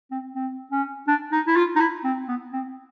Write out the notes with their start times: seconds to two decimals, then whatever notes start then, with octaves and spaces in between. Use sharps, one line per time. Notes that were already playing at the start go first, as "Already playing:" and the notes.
0.11 C4
0.35 C4
0.72 C#4
1.08 D4
1.32 D#4
1.47 E4
1.56 F4
1.76 D#4
1.80 E4
2.04 C4
2.28 B3
2.53 C4